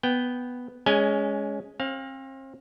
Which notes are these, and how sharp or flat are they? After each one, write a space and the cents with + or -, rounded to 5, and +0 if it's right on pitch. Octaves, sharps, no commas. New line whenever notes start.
B3 +0 G5 +0
G#3 +0 C#4 +15 G#5 +0
C4 +40 F5 +15